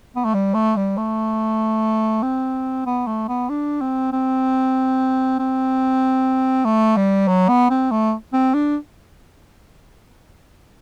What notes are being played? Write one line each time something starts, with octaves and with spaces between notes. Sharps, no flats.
B3
A3
G3
A3
G3
A3
C4
B3
A3
B3
D4
C4
C4
C4
A3
G3
F#3
B3
C4
A3
C4
D4